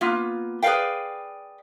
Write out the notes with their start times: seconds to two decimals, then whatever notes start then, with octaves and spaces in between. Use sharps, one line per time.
0.01 A#3 B3 F4
0.63 G#4 B4 C#5 D5 F5 G5